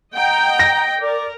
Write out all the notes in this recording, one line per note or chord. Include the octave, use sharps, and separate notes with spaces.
D#5 F#5 G5 A#5
A#6
A#4 D5 D6